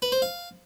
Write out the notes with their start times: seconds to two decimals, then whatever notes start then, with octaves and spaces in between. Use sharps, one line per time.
0.02 B4
0.12 C5
0.22 F5